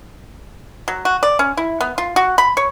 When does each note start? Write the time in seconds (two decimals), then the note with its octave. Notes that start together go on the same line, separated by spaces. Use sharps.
0.88 F#3
1.05 F#4
1.23 D5
1.39 C#4
1.57 E4
1.81 B3
1.98 F4
2.16 F#4
2.38 B5
2.57 C#5